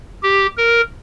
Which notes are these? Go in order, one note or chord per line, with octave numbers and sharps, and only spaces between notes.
G4
A#4